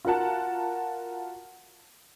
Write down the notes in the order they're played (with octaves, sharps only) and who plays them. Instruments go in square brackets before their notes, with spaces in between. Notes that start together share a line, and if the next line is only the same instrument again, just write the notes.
[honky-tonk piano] F4 F#4 A#4 F#5 A5